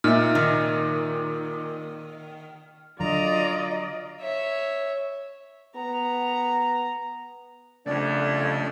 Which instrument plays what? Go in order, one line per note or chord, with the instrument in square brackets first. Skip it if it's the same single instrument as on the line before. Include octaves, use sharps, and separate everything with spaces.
[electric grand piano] A#2 [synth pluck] D#4 E5 [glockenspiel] F6
[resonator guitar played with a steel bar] D#3
[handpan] D3 F#3 [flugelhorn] F4 [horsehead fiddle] D5 D#5 [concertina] A#5
[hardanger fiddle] C#5 E5
[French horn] B3 [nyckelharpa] A#5
[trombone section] C2 F2 [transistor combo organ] C#3 A3 [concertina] D4 D5